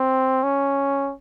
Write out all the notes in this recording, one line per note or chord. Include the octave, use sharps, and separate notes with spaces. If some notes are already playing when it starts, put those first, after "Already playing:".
Already playing: C4
C#4